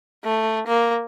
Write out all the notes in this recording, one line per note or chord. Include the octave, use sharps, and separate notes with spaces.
A3
A#3